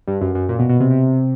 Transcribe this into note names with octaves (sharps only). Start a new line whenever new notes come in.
G2
F#2
F#2
A#2
B2
B2
C3
C3